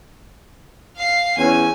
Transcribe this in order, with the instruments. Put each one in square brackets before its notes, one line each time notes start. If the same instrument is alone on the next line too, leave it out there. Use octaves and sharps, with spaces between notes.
[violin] F5 C7
[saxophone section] E2 C#4 [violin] G#5